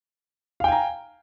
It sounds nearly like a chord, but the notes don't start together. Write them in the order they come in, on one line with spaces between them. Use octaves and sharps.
F5 G5 G#5 A#5